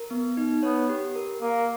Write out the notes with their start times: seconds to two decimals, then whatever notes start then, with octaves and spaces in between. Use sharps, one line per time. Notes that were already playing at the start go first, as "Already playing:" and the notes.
Already playing: A#4
0.11 B3
0.37 D#4
0.63 B3 C#5
0.89 G4
1.16 A#4
1.41 A#3 A#4